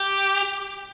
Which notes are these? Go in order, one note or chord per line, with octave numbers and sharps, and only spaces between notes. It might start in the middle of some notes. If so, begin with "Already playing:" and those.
Already playing: G4